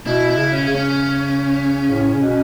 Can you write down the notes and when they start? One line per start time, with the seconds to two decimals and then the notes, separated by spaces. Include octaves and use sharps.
0.06 B2 E4
0.30 E4
0.37 C#3
0.52 C#4
0.68 C#3
0.75 C#4
1.90 A2
2.14 C#3
2.21 B2